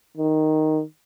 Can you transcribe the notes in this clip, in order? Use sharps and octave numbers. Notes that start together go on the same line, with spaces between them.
D#3